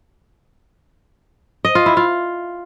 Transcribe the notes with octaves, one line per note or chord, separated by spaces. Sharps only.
D#5
F4
E4
F4